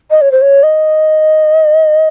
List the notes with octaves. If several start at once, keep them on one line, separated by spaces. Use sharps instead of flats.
D#5
C#5
C5
C#5
D#5